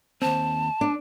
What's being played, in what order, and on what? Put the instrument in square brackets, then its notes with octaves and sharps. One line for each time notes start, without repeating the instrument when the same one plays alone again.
[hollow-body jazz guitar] D#2 C4 [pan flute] A5
[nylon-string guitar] D4